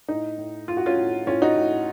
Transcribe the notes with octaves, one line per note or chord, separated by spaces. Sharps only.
A2 D#4
A2
A2 F4
F#4
C#4 F4
A2
A2 C#4 F4
D#4 F#4
A2